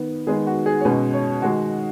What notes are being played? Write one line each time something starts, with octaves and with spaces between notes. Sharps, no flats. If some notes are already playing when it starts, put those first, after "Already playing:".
Already playing: D#3 B3
D#3 G#3 B3 G#4
F#4
G#4
C#5
B2 G#3 C#4 B4
C#5
D#3 G#3 F#4